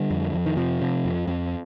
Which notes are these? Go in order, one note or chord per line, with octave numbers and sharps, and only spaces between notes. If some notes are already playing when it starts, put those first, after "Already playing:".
Already playing: D3 G3
F2
F2
D#3
C3 F3
C3
F2
F2